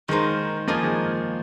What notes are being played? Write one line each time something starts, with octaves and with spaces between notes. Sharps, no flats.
D#3 G#3 A#3 D#4 C5
F3 A#3 F4 G#4 D#5 G#5
D#3 G#3